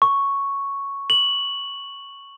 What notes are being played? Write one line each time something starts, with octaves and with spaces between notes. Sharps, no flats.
C#6
F#7